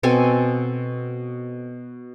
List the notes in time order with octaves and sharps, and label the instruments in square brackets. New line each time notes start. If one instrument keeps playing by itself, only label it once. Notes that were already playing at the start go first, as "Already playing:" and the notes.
[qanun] B2 C4 A4 G#5